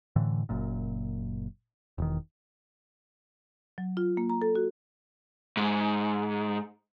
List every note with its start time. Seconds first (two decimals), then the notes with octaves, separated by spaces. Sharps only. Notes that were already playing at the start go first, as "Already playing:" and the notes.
0.16 A2 D3 E3
0.49 F#1 F#2 A#2
1.98 E1 D#3
3.78 F#3
3.97 F4
4.17 A#3
4.30 A#5
4.42 A4
4.55 F#4
5.57 G#2